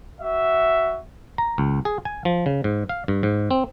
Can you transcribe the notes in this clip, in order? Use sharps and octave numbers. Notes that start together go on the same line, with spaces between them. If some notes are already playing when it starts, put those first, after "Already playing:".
F#4 E5
A#5
C#2
G#4
G#5
F3
C#3
G#2
F5
G2
G#2
C4